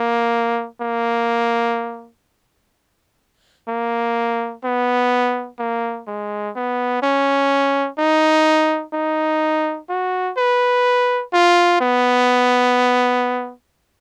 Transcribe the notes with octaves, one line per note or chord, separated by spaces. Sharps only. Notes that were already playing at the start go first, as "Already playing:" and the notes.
Already playing: A#3
A#3
A#3
B3
A#3
G#3
B3
C#4
D#4
D#4
F#4
B4
F4
B3